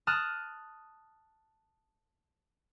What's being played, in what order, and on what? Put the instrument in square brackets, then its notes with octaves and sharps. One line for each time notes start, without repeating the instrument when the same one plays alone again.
[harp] A5 D#6 F6 F#6